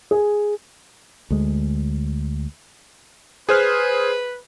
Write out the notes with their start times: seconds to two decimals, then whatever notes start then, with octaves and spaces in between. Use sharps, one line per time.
0.11 G#4
1.30 D2 G#3
3.49 G#4 B4 C5 F6